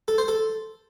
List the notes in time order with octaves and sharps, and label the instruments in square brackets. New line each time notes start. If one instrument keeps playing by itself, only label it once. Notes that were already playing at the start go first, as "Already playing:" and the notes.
[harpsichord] A4
C5
A4